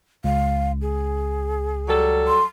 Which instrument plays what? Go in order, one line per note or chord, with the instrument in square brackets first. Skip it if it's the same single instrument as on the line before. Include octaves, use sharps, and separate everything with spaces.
[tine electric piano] C#2 [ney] F5
[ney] G#4
[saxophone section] F#3 G3 A4
[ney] C6